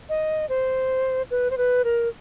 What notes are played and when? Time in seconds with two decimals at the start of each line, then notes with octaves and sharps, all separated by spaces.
0.09 D#5
0.49 C5
1.31 B4
1.50 C5
1.58 B4
1.84 A#4